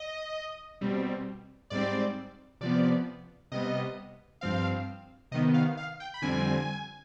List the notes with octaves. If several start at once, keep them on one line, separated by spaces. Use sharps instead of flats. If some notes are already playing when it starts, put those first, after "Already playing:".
Already playing: D#5
B2 G3 C4
G#2 G3 C4 D5
C3 F3 B3 D5
C3 G3 B3 D#5
G2 F3 C4 F5
C3 D#3 B3 D#5
F5
F5
G5
B5
F2 D3 G3 C4 G#5